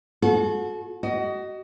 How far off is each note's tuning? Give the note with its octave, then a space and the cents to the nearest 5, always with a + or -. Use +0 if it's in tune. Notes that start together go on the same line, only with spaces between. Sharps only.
F#4 -30 A4 -35
F#4 +30 D#5 +0